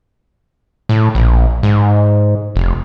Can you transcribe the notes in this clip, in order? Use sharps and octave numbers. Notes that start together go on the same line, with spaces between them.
A2
A#1
G#2
F1